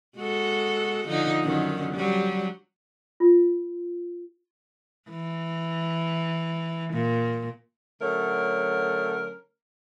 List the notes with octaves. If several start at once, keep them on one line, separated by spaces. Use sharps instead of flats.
G#3 F#4 A4
D3 F3 D#4
F#2 D3 D#3
F#3 G3
F4
E3
A#2
D3 F#3 A3 C#4 A#4